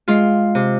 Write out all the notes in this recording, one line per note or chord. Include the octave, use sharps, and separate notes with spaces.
G#3 F4
C3